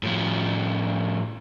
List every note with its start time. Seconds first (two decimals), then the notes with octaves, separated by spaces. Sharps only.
0.03 A2 F3